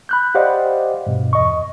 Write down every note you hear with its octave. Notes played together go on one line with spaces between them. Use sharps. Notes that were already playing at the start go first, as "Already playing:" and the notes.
B5 F#6 G6
G4 C5 D5 D#5 F5 F#5
G2 B2
E2 D#5 C#6